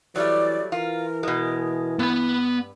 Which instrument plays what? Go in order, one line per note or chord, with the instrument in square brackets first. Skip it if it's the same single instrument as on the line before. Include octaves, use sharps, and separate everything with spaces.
[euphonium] E3 [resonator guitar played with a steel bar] F#3 G3 A3 [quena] D5
[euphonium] E3 [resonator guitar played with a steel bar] F4 [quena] A#4
[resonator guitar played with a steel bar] B2 G#3
[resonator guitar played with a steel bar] G2 [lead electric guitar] B3 B5